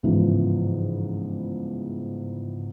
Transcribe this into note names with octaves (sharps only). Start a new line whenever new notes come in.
G1 C#2 G#2 E3 F3